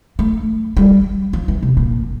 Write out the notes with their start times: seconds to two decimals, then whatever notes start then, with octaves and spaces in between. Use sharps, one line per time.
0.19 A3
0.77 G3
1.33 F3
1.48 E3
1.62 C3
1.77 A#2